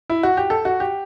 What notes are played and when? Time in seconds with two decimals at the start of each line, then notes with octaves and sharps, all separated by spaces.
0.10 E4
0.23 F#4
0.37 G4
0.50 A4
0.65 F#4
0.80 G4